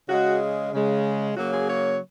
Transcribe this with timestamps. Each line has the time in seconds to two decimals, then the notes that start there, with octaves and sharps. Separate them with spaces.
0.09 C#3 G#3 F#4
0.72 C#3 G#3
1.36 C#3 F#3 A#3 F#4
1.52 G#4
1.68 C#5